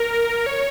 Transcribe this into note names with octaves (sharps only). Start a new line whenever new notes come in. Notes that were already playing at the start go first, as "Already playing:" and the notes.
Already playing: A#4
C#5